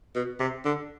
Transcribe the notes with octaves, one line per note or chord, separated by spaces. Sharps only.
B2
C3
D3